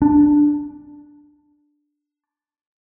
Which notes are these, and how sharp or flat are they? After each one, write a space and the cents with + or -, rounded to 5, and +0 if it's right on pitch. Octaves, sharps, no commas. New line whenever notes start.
D4 +5